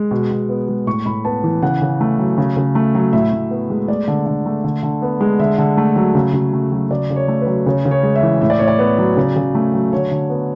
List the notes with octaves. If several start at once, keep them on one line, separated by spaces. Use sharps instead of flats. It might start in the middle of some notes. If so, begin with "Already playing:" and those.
Already playing: G#3
B2
B2
B3
G#3
A2 C#6
A2 B5
B3 A5
E3
C#3 F#5
C#3
A3
F#3
C#3
C#3
A3
F#3
A2 E5
A2
B3
G#3
A3 D5
D3
D3
A3
D3
D3
B3
G#3
D3 E5
D3
A3
F#3
C#3
C#3
A3
F#3
C#3 D5
C#3
C#5
A3
B4
F#3
C#3 C#5
C#3
C#5
G#3
E5
E3
A2 E5
D5
A2 C#5
D5
B3
F#3
C#3
C#3
A3
F#3
D3 C#5
D3
B3